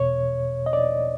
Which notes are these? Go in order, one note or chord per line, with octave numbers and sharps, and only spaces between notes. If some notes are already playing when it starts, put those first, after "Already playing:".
Already playing: E2 B2 C#5
D#5
D5